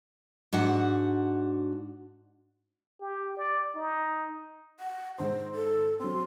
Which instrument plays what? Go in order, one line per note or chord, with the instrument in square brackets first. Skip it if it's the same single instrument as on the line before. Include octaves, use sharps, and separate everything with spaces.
[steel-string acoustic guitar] G#2 D4 F#4 F#5
[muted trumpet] G4
D5
D#4
[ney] F#5
[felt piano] G#2 D#3 C6 [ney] C5
[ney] A4
[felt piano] F#3 C4 [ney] C6